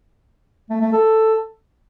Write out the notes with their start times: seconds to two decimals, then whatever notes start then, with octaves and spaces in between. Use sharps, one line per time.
0.70 A3
0.81 A3
0.93 A4